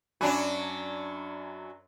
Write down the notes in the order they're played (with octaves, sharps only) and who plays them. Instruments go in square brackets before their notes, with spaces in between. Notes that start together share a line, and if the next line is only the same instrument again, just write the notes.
[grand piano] F#2 G#5 B5 [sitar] F#3 D4 F#4